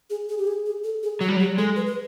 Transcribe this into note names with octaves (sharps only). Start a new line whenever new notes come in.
G#4
G#4
G4
G#4
G#4
A4
G#4
F#3 F#4
G3
F#3
G4
G#3 A4
B4
B4